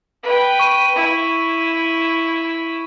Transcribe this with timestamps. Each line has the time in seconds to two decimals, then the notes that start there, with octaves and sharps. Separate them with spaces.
0.23 B4 G5
0.59 C#6 D#7
0.95 E4